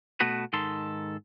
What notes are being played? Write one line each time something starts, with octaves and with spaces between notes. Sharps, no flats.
B2 A3 B3 F#4 B4
G#2 D#3 A4 C6